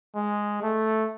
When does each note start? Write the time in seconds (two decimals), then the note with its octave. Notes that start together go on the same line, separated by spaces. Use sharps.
0.15 G#3
0.62 A3